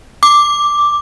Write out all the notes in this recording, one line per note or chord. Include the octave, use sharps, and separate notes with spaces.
D6